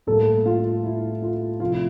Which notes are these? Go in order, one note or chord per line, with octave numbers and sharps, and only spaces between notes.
A2 G3 A#3 A4
F4
E4
F4
C3 F3 A3 F4
E4